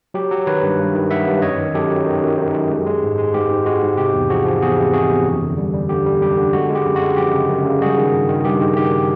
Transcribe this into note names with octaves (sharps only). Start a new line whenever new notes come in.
F#3 G4
F#3
D#3 B4 C#5
G2
G2
D#3
G2 E5 F#5
G2
F#2 C#5 D#5
D#3
F#2 G4 A4
F#3
D#3
F#2
D#3
F#2
G#3
G#3
G#2
G#3
G#2 G4
G#2
G#3 F#4
G#2
C3 G4
E2
F3 F#4 G#4
F3
E2 F#4 G#4
C3
C3 F#4 G#4
E2
F#2
D3
G3
G3
D3 G4
G3
F#2 G4
D3
G#3 F#4
G#3
G4
F#2
F#4
G#3
F3 G4
C#3
F#2
C#3
G3 F#4 G#4
D#3
G2
D#3
G2 G4
D#3
D#3 G4